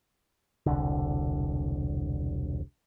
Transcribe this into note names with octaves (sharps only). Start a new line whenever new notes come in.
E1 C2 D3